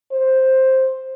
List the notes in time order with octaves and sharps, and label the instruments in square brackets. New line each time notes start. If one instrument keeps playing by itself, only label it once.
[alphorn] C5